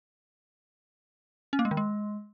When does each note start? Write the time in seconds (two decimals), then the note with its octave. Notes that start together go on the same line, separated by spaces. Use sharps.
1.53 C#4
1.59 A#3
1.65 G#3
1.71 D#3
1.77 G#3